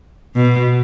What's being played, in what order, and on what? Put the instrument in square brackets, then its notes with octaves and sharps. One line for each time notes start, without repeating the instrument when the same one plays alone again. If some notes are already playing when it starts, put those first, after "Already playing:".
[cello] B2